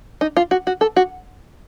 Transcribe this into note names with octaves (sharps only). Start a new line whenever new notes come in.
D#4
F4
F#4
F#4
A4
F#4